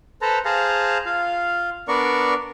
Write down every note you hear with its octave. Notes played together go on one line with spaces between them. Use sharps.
A4 B4 C5 A5 A#5
G#4 C5 F5 A5 A#5
F4 F5
B3 D4 A#4 D5 C#6